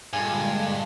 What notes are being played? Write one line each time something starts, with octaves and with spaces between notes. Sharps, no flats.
G2 A#2 D3 G#3 G#5